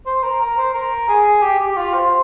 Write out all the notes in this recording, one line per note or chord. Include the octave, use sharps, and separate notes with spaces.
C5
A#4
A#4
C5
A#4
G#4
G4
G4
F4
C5